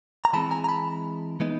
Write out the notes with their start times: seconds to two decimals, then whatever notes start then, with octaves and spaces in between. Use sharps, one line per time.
0.25 A#5
0.33 E3 G#3 C4 A5 B5
0.51 G#5 A#5
0.64 A#5
0.69 A5 B5
1.40 E3 G#3 B3 D#4